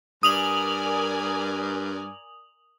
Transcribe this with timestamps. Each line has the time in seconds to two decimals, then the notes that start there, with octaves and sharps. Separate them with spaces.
0.23 G2 A#4 D5 G#5 D#6 F7 F#7